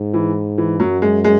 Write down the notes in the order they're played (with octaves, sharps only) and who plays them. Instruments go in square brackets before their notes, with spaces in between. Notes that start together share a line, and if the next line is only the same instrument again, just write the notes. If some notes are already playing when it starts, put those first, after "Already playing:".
Already playing: [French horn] G#2
[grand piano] E3
E3
[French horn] F#2 [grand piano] F#3
[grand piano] G#3
G#3